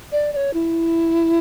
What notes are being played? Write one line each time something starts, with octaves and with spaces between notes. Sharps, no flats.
D5
D5
C#5
E4